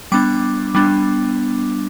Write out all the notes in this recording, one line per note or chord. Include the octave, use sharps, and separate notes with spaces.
G3 B3 D4 D6
G3 B3 D4